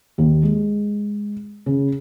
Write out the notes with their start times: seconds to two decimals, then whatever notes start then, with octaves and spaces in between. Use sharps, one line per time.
0.18 D#2
0.43 G#3
1.66 C#3